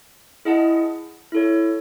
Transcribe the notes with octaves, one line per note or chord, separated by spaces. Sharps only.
E4 G#4 D#5 F#5 A5
E4 A4 C#5